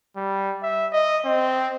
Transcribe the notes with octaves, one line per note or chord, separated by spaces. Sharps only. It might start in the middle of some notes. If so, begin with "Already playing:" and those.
G3
E5
D#5
C4